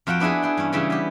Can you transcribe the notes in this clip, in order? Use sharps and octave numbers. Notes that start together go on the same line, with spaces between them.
F2 F4 F#4 F#5 G5
B3 D4 E4 G#4 B4
E4 G#4 G5
G2 E3 C#4
C#3 E3 G3 E4 G#4
B3 G4